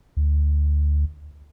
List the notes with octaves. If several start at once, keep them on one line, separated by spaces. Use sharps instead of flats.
D2